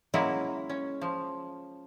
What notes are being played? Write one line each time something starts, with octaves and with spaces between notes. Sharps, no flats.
C#3 F#3 G#3 A#3 C#4 E4
C#4
F3